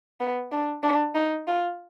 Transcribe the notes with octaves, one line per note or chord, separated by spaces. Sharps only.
B3
D4
D4
D#4
F4